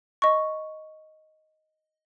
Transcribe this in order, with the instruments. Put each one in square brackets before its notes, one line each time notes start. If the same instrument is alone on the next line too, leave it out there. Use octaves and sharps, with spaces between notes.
[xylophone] D#5 C#6